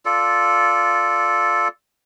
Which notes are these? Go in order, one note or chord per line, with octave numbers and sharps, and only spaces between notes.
F4 A4 D5